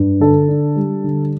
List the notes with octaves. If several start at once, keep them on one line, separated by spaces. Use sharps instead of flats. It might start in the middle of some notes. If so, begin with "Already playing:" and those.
Already playing: G2
D3 A4
D4
G3
D3